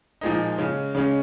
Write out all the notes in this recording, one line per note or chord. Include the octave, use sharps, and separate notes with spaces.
A#2 F3 G#3 D#4
C#3 G#3 C#4
C#3 G#3 C#4